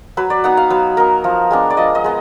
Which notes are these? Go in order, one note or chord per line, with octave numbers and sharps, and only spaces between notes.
F#3 B4
D5
B3 D#4 F#5
F5
F#3 B4
B3 D#4 A#4
F3
G#3 B3 D4
D5
F3 D#5
D#5
G#3 B3